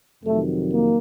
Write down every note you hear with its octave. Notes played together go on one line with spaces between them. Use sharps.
F2 C3 D#3 F#3 A3
A#3